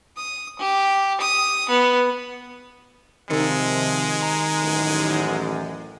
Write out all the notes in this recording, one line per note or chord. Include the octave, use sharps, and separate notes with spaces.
D#6
G4
D#6
B3
C3 D#3 F3 G#3 D#4 C#7
A#5
A1 F#2